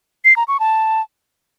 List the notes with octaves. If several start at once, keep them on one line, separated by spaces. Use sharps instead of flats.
C7
A#5
C#6
A5